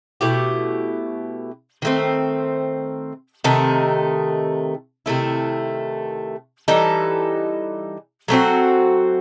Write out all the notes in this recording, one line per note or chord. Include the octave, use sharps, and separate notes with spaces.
B2 A3 E4 G4
D#3 A3 C4
C3 D#3 A3 D#4
C3 D#3 A3 E4
E3 G3 D#4 A4
F#3 A3 C4 F#4